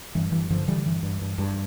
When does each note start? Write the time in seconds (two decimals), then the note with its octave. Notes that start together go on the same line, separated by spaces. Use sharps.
0.15 G2 E3
0.32 G2 E3
0.50 G2 D3 F3
0.68 D3 E3 G3
0.86 G2 E3
1.03 G2
1.22 G2
1.38 G2